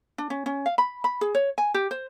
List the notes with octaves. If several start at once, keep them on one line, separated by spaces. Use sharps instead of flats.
D4
C#4
C#4
F5
B5
B5
G#4
C#5
G#5
G4
C5